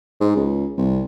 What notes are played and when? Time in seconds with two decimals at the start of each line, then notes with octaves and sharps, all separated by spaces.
0.20 G#2
0.35 C#2
0.77 C2